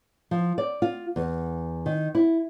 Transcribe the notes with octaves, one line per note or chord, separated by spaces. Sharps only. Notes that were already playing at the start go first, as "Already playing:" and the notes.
F3
D5
F4
E2
D#3
E4